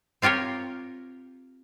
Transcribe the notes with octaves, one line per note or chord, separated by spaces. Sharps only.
C4 F4 G4 A#4 C#5